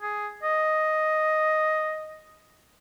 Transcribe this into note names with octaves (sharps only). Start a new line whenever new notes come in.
G#4
D#5